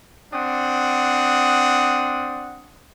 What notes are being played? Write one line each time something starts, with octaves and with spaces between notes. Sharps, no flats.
C4 D4 F#5 D#6